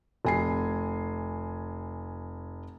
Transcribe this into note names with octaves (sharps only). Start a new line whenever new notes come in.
F1 G#5 C7